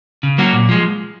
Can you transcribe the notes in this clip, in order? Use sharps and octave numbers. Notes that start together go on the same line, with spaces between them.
C#3
F#3 A#3 C#4 F#4
A#2
F3 G#3